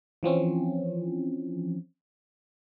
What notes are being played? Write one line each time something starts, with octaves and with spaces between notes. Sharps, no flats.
E3 F3 C4 C#4